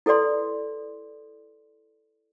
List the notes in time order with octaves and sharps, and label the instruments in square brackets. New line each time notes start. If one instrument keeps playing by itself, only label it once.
[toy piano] E4 A4 B4 D5 C6